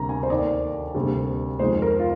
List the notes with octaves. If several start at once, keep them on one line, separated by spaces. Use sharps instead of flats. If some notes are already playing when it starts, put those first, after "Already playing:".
Already playing: D2 C3 G3 A#3 A#5
G#5
C5
D#2 D#3 A#3 D5
D2 C3 G3 A#3
F2 D#3 G#3 C5
A#4
F4